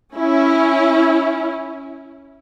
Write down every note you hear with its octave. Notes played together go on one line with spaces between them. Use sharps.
C#4 E4